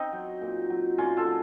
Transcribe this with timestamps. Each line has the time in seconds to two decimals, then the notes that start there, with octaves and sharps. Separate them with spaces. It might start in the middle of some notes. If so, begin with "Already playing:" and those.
Already playing: C4 D#4
0.13 F#3
0.41 A#2
0.70 F#3
0.98 A#2 C#4 F4
1.17 F4 A4
1.27 F#3